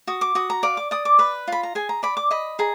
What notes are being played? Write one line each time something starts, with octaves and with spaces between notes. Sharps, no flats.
F#4 D#6
D6
F#4 D#6
A#5
D5 F5
D6
D5 D#6
D6
B4 B5
F4 B5
A#5
G#4 G#5
A#5
D5 B5
D6
D#5 B5
G#4 A#5